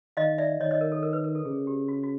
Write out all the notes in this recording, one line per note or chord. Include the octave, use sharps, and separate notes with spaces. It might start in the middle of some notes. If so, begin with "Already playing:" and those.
D#3 D#5 F5
D5 E5
D#3 C#5 D#5
C#5 D#5
A#4
A4
A#4
B4
A#4
A4
C#3 G#4
G4
F#4
F#4